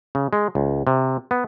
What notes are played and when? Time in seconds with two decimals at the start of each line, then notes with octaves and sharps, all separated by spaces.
0.15 C#3
0.33 G#3
0.55 C#2
0.87 C3
1.31 B3